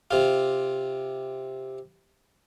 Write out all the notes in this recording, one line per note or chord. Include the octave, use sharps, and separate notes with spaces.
C3 F4